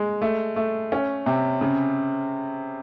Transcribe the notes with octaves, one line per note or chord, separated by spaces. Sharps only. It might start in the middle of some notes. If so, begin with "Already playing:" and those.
Already playing: G#3
A3
A3
C#4
C3
C#3